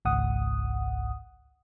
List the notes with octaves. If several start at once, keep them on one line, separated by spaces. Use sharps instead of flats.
G#1 C#2 G#2 F#5 D#6